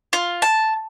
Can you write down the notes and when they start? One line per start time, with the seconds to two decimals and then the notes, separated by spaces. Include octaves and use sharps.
0.13 F4
0.42 A5